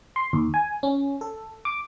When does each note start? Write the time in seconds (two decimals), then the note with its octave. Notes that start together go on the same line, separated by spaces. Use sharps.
0.16 C6
0.33 D#2
0.54 G#5
0.83 C#4
1.21 A4
1.65 D6